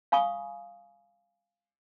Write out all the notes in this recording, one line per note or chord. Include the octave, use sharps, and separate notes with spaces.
F5 G#5 B5 C#6 D#6